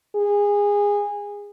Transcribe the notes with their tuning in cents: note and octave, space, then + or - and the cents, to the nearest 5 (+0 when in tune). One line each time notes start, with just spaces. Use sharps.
G#4 -25